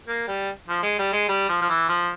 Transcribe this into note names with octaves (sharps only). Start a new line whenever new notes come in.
A#3
G3
F3
G#3
G3
G#3
G3
F3
F3
E3
F3